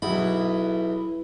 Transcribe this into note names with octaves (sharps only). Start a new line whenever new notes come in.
B1 E2 E4 B5